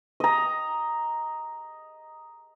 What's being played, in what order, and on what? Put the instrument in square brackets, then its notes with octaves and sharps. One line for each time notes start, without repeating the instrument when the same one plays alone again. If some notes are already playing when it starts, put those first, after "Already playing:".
[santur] D#5 A#5